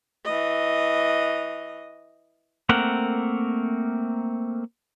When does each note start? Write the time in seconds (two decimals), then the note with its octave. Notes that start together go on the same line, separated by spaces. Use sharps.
0.25 E3 D#5
2.69 A3 A#3 C4 A#4 F#5